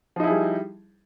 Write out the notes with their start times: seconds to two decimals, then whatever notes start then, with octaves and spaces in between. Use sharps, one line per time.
0.16 F3
0.20 D#4
0.23 E4
0.27 G#4
0.31 G3